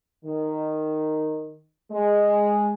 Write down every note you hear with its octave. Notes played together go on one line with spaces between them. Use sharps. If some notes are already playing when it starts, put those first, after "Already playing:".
D#3
G#3